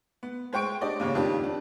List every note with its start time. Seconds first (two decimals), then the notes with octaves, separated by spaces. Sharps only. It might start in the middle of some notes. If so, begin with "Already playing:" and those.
0.23 B3
0.53 G#3 C5 G5 C#6 D7
0.81 D4 G4 D5 D#5
1.00 D#2 G#2 C#3 G4 C#5
1.15 F2 D#3 D4 G4
1.43 D4